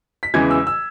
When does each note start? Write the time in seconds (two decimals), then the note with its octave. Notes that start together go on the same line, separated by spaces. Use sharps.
0.23 B6
0.34 E2 C#3 E3 G#3 G#6
0.51 E6
0.67 E6